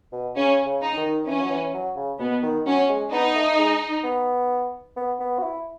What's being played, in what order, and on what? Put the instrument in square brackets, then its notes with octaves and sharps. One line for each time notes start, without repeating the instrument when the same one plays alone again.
[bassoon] B2
[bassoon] C#3 [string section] C#4
[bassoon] C#3
[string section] D#4
[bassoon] D#3
[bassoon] E3 [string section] C#4
[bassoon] F#3
E3
F#3
C#3
[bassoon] B2 [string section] B3
[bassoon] D#3
[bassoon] F#3 [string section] C#4
[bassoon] G#3
[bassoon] B3 [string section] D#4
[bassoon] A3
G#3
B3
B3
B3
F#4
E4